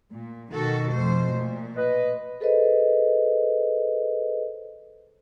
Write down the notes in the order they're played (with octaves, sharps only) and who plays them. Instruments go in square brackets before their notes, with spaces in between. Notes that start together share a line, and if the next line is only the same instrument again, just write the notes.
[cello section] A#2
[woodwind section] B2 [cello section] D#3 F#4 A4
[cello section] F2 A3 C5
A#2
[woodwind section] B4 D#5
[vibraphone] G#4 A4 B4 C5 D#5